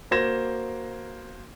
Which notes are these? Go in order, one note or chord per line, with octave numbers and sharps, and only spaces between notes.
A#3 F#4 C5 G#6 A#6 E7